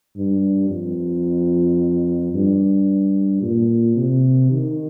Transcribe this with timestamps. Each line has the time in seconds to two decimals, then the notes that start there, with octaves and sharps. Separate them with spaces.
0.16 G2
0.70 F2
2.34 G2
3.42 A#2
3.97 C3
4.51 D#3